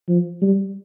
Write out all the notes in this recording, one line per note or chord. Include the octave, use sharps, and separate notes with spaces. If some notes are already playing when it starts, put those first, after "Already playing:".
F3
G3